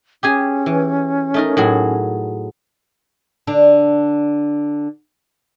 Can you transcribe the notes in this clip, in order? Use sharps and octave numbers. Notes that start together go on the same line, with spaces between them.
C#4 G4 G#4 G#5
E3
A3 D#4 A#4
A2 F#3 G#4
D3 D4